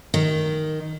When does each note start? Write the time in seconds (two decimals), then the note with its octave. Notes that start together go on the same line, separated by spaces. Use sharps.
0.14 D#3